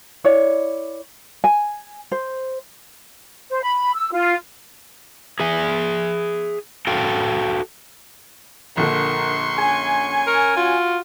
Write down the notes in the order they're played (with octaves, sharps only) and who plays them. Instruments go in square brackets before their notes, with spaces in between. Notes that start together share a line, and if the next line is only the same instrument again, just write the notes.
[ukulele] E4 C#5 D5
G#5
C5
[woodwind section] C5
B5
E6
F4
[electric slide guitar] G#4 E5 G#5
F#4 A4 F5 G5
[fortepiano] A#1 D3 [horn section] A#4 [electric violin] C6 C#6
[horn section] C#4 G#5
[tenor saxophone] A#4 [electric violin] C#6
[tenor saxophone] F4 [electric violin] F#4